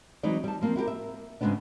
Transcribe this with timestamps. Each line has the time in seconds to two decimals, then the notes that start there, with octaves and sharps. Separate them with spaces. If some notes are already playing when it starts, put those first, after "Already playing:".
0.23 E3 F#3 G#3 C4 D#4 D5
0.44 G3 A5
0.61 F3 A#3 C4
0.76 E4 F#4 G4 A#4
0.87 E5
1.41 G#2 C#3 F#3 G#3 B3 D4